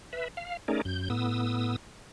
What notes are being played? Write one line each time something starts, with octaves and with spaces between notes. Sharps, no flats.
B4 E5
F5
A3 C#4 D#4 G#4 A#4 D5
F#2 G6
A2 B3 D#6 E6